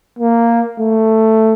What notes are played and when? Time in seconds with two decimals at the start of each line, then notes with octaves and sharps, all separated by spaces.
0.19 A#3
0.80 A3